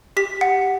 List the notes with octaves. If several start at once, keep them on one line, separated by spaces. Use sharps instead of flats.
G4 B6
F#5